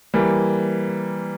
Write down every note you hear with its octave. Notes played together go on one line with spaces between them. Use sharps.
E3 G3 A#3